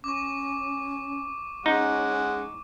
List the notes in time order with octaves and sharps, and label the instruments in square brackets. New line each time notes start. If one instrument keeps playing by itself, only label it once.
[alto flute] C#4 [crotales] C#6 D6
[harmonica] G#3 F#5 [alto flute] C#4 [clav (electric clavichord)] D#4